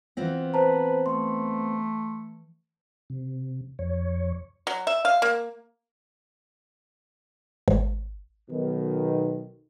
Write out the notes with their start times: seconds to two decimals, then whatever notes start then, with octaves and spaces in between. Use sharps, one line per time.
0.17 E3 B3 C4 F4 A#6
0.54 B4 C5 A5 A#5
1.06 A3 C6
3.10 C3
3.79 F2 C#5
4.67 F#3
4.87 E5
5.05 F5
5.22 A#3
7.68 G#1
8.51 B1 B2 D#3